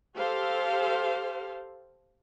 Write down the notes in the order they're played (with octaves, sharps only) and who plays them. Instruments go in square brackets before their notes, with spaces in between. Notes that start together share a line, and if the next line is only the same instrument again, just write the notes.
[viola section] G4 A4 C5 F5